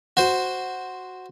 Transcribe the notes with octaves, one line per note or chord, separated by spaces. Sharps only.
F#4 C5